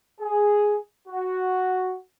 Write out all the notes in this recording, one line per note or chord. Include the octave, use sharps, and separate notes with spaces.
G#4
F#4